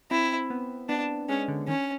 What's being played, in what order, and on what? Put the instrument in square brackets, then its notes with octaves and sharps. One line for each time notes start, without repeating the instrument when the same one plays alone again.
[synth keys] C4 [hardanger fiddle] E4
[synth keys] B3
[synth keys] B3 [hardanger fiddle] D4
[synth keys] G#3 [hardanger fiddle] C#4
[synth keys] D3
D3
[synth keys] D#3 [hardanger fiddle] C#4